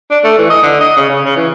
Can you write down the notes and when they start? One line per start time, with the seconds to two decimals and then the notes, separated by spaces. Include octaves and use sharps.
0.11 D4
0.24 A3
0.38 E3
0.50 D#5
0.63 D3
0.80 D#5
0.97 C#3
1.10 C#3
1.25 C#3
1.37 E3